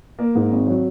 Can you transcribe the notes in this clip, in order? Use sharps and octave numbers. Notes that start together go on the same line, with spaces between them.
A#3
G#2
G#1
F#3